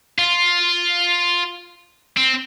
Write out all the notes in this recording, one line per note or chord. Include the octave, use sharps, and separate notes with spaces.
F4
C4